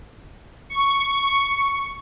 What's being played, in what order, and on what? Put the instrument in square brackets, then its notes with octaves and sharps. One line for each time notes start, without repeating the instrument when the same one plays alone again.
[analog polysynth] C#6